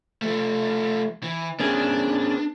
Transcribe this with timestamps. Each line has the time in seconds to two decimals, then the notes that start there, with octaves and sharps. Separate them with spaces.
0.22 F3 A3
1.23 E3
1.60 B3 C#4 D4 G#4